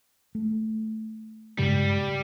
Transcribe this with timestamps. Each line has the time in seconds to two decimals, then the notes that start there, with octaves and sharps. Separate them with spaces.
0.35 A3
1.59 G2 C#3 G3 G#3